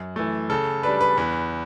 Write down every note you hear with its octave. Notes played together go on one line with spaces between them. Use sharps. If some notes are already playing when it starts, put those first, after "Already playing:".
Already playing: F#2
E3 A3
C#3 A4
G3 D4 B4
B4
E2 B4